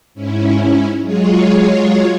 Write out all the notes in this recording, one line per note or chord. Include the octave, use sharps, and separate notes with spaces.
G#2 C#4 E4
F#3 G#3 F4 G#4 C#5